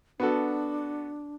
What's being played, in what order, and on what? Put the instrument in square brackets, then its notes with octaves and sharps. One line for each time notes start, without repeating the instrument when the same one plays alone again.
[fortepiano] B3 F#4 A4 [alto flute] D4